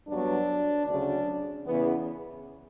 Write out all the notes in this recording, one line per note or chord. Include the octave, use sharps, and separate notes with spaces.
G2 F#3 B3 D4
D2 C#3 F#3 D4
E2 C#3 E3 B3